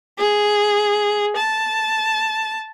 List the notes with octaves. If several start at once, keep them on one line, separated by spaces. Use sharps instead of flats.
G#4
A5